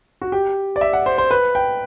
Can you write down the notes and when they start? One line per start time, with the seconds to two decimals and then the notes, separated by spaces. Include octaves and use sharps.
0.22 F#4
0.32 G4
0.76 D5
0.81 E5
0.93 F#5
1.06 C5
1.18 C5
1.31 B4
1.55 G5